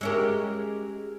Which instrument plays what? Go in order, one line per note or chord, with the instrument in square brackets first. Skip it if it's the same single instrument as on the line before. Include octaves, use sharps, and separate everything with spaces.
[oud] G#3 C#4 G4 [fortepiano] A#4 E6